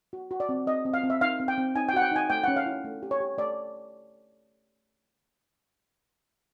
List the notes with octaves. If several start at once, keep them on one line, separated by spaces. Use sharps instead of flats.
F#4
F#4
D5
C4
C4 D#5
C4
F5
C4
E5
D#4 F5
C4
G5
C4
D#4 G#5
G5
F#4 F#5
G5
D#4 G#5
A3 G5
C#4 F#5
F5
E4
A3
G4
C#5
G4
A3 D5